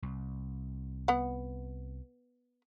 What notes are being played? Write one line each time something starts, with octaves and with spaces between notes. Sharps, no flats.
C2
B3 F#5